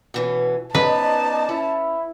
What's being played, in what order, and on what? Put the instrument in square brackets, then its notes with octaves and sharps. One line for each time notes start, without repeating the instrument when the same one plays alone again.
[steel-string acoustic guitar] B2 E3 C#4
[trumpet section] B3 D#4 D5 [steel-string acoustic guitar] C#4 C5 D#5 [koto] B4 [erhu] A5
[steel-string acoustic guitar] C#4 [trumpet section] E4